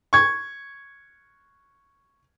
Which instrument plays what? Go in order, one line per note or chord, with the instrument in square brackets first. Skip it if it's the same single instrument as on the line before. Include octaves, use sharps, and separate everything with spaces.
[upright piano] C#6 G#6